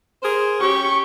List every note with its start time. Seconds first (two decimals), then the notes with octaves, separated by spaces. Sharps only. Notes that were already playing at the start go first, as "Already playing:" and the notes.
0.23 G#4 A#4 C5
0.61 C#4 G4 C#6